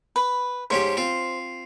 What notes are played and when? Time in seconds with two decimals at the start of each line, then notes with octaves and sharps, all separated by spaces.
0.16 B4 B5
0.70 G#2 C#4 G4 C5
0.97 C4 F4